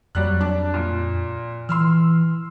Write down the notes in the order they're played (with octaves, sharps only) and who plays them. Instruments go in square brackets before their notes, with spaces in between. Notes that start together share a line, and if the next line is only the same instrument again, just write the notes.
[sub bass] F2 [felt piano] F#3 G3 F#6
[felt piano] D4
A#2
[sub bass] E3 [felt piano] C6 E6 F6